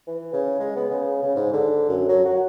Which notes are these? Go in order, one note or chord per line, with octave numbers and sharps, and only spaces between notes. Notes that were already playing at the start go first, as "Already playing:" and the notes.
E3
C#3
G#3
B3
C#3
C#3
G#2
D3
F#2
F#3
F#4